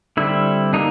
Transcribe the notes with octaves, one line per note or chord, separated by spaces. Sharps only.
D3 G3 C4 E4
A#3 D4 D#4